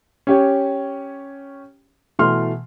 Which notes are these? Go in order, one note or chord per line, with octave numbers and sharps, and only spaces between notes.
C#4 G4 C#5
B2 E3 A3 C6 F6